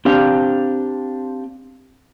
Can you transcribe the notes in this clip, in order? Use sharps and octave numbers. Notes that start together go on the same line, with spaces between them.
C4 D4 G4 F5